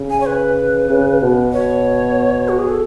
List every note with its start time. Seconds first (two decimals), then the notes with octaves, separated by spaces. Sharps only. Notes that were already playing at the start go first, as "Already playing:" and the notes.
Already playing: C#3
0.10 G#5
0.20 C#5
0.26 B4
0.89 C#3
1.22 B2
1.53 C#5
2.49 F#4
2.59 G#4
2.70 A4